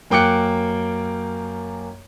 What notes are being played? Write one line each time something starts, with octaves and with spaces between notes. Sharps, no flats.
F#2 A#3 G5 D6 F#6 C#7